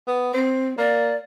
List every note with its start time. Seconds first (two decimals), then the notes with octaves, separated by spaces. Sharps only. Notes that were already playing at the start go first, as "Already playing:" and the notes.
0.07 B3
0.34 C4 C5
0.78 A#3 D5